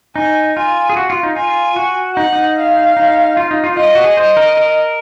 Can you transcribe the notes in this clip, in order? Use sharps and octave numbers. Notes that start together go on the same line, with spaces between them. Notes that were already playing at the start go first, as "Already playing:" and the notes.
D#4 G#5
F4 G#5
G#4
F#4
F4
D#4
F4 G#5
F#4
D#4 F#5
D#4
F5
D#4
F4
D#4
F4
F4 D#5
F#4
G#4
C5 D#5
A#4
A#4